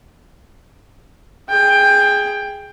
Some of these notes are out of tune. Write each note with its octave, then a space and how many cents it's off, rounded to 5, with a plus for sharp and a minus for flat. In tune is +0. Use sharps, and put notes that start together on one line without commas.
G#4 +0 G5 +15